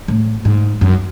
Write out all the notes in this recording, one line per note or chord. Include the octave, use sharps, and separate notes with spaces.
A2
G#2
F#2